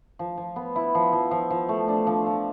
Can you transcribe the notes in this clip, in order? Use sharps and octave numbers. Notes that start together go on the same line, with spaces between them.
F3
F3
B3
E4
F3
F3
F3
F3
A3
D4
F3
F3